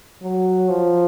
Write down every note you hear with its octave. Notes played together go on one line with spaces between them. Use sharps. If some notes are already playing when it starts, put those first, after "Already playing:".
F#3
F3